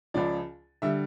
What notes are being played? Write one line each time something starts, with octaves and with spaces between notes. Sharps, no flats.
C#2 C#3 F3 D5
D3 G3 E5